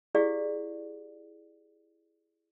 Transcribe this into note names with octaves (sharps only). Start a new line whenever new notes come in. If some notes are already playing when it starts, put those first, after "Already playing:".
E4 G4 G#4 D5 F5